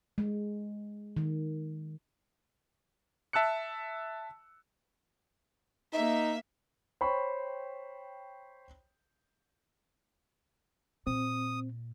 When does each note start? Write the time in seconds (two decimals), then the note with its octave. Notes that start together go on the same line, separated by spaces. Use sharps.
0.18 G#3
1.17 D#3
3.33 E5 A5 E6 F#6 C#7
5.93 A#3 D#4 E5
7.01 C5 C#5 G5 B5 C#6
11.07 A#2 C4 D#6